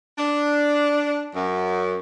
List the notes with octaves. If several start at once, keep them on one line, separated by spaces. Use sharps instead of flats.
D4
F#2